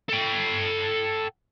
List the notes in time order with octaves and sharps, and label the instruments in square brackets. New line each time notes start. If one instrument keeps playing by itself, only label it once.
[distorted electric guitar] A4 G5